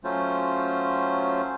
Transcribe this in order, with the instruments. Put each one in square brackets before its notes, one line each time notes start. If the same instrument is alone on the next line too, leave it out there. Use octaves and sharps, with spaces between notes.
[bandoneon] F#3 A3 C#4 F4 C5